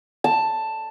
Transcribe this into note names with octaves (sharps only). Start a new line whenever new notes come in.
A5